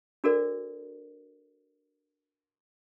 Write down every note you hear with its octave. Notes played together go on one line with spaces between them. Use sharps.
D4 F#4 A4 A#4 C5 D5